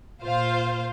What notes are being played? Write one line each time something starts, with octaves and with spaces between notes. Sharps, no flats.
A#2 F4 C5 F5